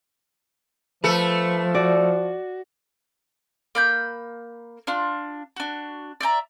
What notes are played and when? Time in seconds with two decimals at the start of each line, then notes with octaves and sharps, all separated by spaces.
1.04 F3 A3 A4 B4
1.75 F#4 D5
3.75 A#3 B5 G6
4.87 D4 F4
5.56 D4 F#4
6.20 D5 E5 G5 A#5